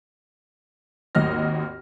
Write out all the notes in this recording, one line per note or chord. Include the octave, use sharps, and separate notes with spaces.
G#1 D#2 D#5 F6 A#6